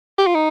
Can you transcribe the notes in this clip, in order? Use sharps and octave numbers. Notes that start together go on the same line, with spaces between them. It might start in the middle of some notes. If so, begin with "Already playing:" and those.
G4
F4
D#4